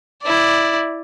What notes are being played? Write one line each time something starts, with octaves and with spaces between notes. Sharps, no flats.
E4 D5